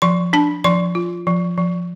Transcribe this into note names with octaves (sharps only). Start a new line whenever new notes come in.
F3 C6
D4 A5
F3 C6
F4
F3
F3